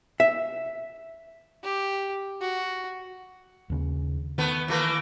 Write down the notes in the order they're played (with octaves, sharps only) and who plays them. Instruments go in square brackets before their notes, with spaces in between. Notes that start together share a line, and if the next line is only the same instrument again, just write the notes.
[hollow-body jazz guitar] E5
[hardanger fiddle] G4
F#4
[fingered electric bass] D#2 C#3
[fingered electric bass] D#3 [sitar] A3 B3
[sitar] E3 A3 A#3